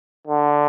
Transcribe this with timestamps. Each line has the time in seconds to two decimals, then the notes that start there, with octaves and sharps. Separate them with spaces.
0.27 D3